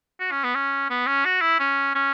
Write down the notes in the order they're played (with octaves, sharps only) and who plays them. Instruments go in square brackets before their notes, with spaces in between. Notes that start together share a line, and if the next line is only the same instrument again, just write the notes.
[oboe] F#4
C#4
B3
C#4
B3
C#4
F#4
E4
C#4
C#4